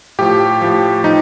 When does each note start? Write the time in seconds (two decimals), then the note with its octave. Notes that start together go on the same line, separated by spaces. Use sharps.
0.19 A2 F3 G4
0.61 A2 F3
1.04 F3 D#4